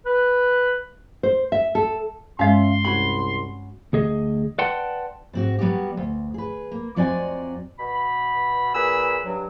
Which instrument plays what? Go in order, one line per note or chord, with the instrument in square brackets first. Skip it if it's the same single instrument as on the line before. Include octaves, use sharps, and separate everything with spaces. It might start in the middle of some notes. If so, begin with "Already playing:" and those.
[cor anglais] B4
[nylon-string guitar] C5
E5
A4
[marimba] G2 G#3 [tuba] C#4 [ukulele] E5 F5 [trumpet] C6
[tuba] C2 [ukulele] C#4 F#4 B5
[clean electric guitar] D2 G#4 D#5
B4 D5 F#5 G5 A5 C6
[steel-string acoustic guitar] G#2 C4 F#4
F#3 G3 B3 F#4 G4
D2
G#4 B4
A#3
F2 F#3 C4 D5 D#5 G#5
[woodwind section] B2 B5
A#2 G#4 B4 B5 E6
G2 F#3